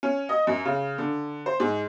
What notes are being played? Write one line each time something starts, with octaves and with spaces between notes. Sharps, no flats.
C#4
D#5
F#2
C#3
D3
C5
G#2